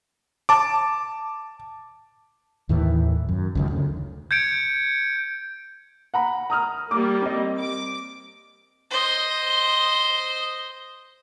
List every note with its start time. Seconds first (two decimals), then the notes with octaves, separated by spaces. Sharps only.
0.49 A5 D6
2.69 D#2 A2 D#3 E3
3.29 F#2
3.55 C#2 F#2 D#3
3.71 D2 C#3
4.31 G6 G#6 C#7 D7
6.14 F#5 A#5 B5
6.50 A#5 D#6 F6
6.91 G3 A#3 D6
7.22 C4 D#5
7.60 D6
8.90 C5 D#5